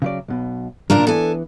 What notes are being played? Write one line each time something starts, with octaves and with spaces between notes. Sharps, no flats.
C#3 F#3 D5
B1 B2
A#2 C#3 F3 D4 A#4
E3 B3 A4 G#5